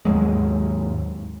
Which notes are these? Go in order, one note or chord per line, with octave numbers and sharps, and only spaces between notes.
D#2 G#2 F#3 G#3